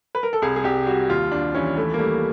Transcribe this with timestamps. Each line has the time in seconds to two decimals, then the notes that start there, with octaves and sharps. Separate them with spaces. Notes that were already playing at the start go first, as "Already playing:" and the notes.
0.15 B4
0.23 A#4
0.33 A4
0.42 C2 G#4
0.56 G#4
0.64 C2 G4
0.87 G3 F#4
1.09 D#2 F4
1.32 D#2 D4
1.55 E3 C#4
1.76 E3 A3
1.94 A#3
1.99 G3 A3